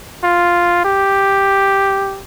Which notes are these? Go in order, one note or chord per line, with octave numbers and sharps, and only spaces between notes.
F4
G4